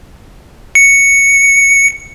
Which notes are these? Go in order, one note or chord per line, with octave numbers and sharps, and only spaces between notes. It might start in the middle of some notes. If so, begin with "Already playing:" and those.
C#7